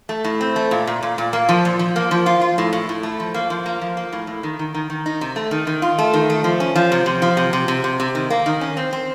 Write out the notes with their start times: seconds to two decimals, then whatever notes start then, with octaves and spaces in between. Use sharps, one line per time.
0.09 A3
0.24 A2
0.41 C4
0.56 A3
0.71 A#2
0.87 A#2
1.03 A#2
1.18 A#2
1.33 A#3
1.49 F3
1.65 A#2
1.79 F3
1.96 A#3
2.11 F3
2.26 F4
2.41 F4
2.58 A2
2.73 A2
2.89 A2
3.03 A3
3.20 F3
3.34 A#3
3.50 F3
3.66 A#3
3.81 F3
3.97 A#3
4.12 A2
4.27 A2
4.43 D#3
4.59 D#3
4.74 D#3
4.90 D#3
5.06 D#4
5.21 C3
5.36 A3
5.51 D#3
5.67 D#3
5.82 F4
5.99 A3
6.13 D#3
6.30 A3
6.44 F3
6.60 C#4
6.76 F3
6.92 C3
7.06 C3
7.22 F3
7.37 C3
7.53 C3
7.68 C3
7.84 C3
8.00 C3
8.15 D#3
8.30 A#3
8.46 D#3
8.61 C#4
8.77 C4
8.93 C4